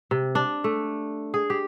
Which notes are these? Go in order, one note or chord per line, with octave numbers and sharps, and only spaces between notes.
C3
D4
A3
G#4
G4